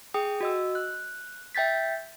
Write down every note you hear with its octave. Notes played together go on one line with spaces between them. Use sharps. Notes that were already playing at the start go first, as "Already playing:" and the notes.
G#4 G5 D#6
F#4 D#5 E6
F#6
E5 G5 G6 A6 B6